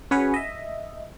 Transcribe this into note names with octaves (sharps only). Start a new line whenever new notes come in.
C#4 F#4 G#4 B4 C#5
D#5 E5